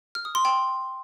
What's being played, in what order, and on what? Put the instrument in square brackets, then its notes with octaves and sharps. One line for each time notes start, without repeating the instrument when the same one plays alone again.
[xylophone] F6
D#6
C6
G5